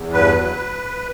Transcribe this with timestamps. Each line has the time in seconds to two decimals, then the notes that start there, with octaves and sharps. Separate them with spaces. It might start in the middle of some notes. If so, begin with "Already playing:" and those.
Already playing: E2
0.12 G2 B4
0.35 F#3